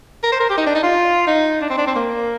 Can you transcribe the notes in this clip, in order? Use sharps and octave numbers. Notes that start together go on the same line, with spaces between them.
A#4
C5
A#4
G4
D#4
D4
D#4
F4
D#4
D4
C4
D4
C4
A#3